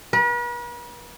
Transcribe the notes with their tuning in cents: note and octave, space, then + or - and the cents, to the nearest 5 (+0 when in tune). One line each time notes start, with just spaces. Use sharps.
B4 -45